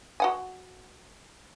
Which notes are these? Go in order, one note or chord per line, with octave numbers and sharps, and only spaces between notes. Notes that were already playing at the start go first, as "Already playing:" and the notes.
F#4 F#5 G#5